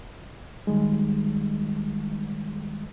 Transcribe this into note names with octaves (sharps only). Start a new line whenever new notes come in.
D#3 G3 G#3